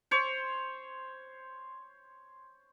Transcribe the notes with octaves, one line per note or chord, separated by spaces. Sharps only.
C5 C#5